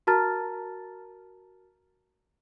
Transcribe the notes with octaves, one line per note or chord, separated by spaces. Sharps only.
F#4 A#4 A5 A#5 F6 A6